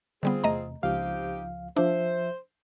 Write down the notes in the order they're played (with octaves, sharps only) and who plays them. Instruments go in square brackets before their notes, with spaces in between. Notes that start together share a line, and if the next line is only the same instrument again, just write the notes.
[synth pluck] D3 G3 B3 [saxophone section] C4 F4 G#4
[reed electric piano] E2 C3 [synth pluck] A3 D#5 A#5
[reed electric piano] C#2 F3 F5 [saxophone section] C4 D#4 G4
[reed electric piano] F3 E5 [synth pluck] D4 [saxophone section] C5